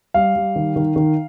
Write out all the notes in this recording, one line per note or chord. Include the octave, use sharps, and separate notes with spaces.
G3 F5
G3
D#3
D#3
D#3